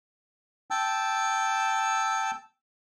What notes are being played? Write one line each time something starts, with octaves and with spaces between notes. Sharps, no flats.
G5 A5 E6